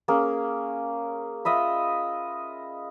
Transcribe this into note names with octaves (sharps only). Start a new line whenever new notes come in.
A#3 C#4 G#4
F4 D#5 E5 B5